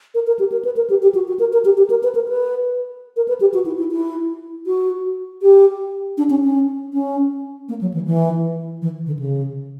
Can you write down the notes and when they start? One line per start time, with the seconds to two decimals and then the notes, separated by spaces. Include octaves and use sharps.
0.15 A#4
0.27 A#4
0.39 G4
0.52 A#4
0.65 B4
0.77 A#4
0.90 G4
1.02 G4
1.15 F#4
1.28 F#4
1.40 A#4
1.53 A#4
1.65 G4
1.78 G4
1.90 A#4
2.03 B4
2.15 A#4
2.28 B4
3.17 A#4
3.28 B4
3.41 G4
3.54 F#4
3.66 E4
3.79 E4
3.92 E4
4.67 F#4
5.42 G4
6.18 D4
6.30 C#4
6.43 C#4
6.93 C#4
7.69 A#3
7.81 F#3
7.94 E3
8.06 E3
8.82 E3
9.06 D3
9.19 C#3